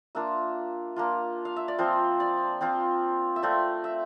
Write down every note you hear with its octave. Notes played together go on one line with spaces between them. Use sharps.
A#3 D4 F4 E5
A#3 D4 F4
F5
E5
D5
F3 C4 F4 C5
D5
F3 C4 F4
E5
A3 C4 F4 D5
E5